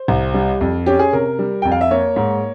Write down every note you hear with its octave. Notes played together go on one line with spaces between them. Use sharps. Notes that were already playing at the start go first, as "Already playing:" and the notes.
Already playing: C5
C2
G3
F2
C#4 G4
G#4
C3 A#4
G3
F2 G5
F5
E5
A#3 C#5
G#2